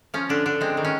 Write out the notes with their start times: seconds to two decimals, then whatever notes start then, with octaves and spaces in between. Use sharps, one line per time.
0.14 F3 C#4
0.29 D3 D4
0.46 D3 D4
0.61 G#3 C4
0.77 D#3
0.85 C#4